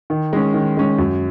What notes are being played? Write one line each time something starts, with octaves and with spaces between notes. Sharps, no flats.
D#3
G#3 C#4
D#3
G#3 C#4
F#2